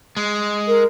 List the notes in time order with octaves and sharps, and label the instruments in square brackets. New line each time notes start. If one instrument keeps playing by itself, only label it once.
[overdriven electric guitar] G#3
[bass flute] A#4